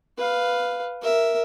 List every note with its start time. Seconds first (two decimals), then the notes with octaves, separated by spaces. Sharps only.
0.17 B4 F5
1.02 A#4 E5